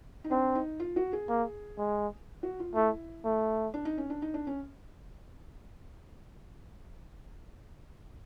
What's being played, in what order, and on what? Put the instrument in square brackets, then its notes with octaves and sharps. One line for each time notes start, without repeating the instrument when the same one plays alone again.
[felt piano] D#4
[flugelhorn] C4 [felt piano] D4
[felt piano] D#4
F4
F#4
G#4
[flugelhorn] A#3
G#3
[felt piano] F#4
F4
[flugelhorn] A3 [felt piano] E4
[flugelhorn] A3
[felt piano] D4
D#4
C#4
D4
D#4
D4
C#4